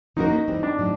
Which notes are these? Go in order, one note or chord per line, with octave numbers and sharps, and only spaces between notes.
F3 A#3 C#4 D#4 F#4 A#4
E3 G3 C4
D4
A2 F#3